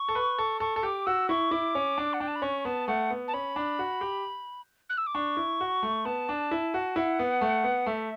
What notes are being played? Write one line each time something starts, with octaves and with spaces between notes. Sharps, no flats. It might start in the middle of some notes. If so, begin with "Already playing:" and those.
Already playing: C#6
A4
B4
A4
A4 C#6
A4
G4 D6
F#4 E6
E4 C#6
E4 D6
C#4
D4
F#5
D4 G5
A5
B5
C#4 C#6
B3 A5
A3 F#5
B3
A5
C#4 B5
D4
F#4
G4
F#6
E6
D6
D4 C#6
E4
F#4
A3
B3 A5
D4
E4
F#4
E4 F#5
B3
A3
B3
A3 E5